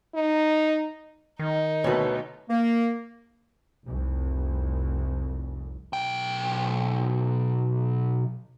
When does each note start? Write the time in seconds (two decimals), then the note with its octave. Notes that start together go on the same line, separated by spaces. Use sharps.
0.14 D#4
1.39 D#3 D#4
1.84 D2 B2 A3 B4 C#5
2.50 A#3
3.86 F1 C2
5.93 B1 G5